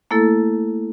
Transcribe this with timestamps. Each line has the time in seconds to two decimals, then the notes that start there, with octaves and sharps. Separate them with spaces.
0.11 A3 A#3 E4 A4